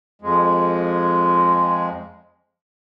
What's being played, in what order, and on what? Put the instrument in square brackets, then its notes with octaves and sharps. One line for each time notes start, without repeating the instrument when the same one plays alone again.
[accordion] F2 G#3